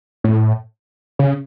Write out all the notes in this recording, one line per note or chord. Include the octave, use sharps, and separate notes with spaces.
A2
C#3